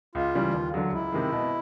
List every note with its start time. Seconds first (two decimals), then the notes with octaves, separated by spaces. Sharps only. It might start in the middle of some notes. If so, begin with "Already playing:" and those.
0.15 C#2 F4
0.35 C#3 E3 G3
0.54 D#2
0.74 D3 F#3
0.92 C#2 E4
1.12 C3 D#3 G#3
1.32 B2